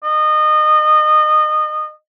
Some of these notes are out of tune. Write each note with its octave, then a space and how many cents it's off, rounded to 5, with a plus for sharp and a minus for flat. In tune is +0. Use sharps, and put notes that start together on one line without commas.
D#5 -25